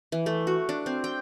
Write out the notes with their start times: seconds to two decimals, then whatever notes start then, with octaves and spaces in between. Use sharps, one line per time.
0.12 E3
0.26 A3
0.47 F#4
0.69 D4
0.86 C4
1.04 G5